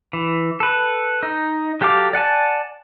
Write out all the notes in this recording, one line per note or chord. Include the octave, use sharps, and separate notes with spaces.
E3
A4 B4
D#4
F#3 G4 A4 F5 D6
D5 F#5 G#5 A5